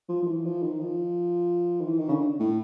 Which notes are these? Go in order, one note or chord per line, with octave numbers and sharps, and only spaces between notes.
F3
F3
E3
F3
D#3
F3
D#3
E3
D#3
C#3
D3
A2